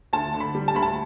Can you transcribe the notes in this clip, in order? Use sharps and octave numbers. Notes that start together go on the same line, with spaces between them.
D2 A5
D3
B5
G3
A5
D2 B5
A5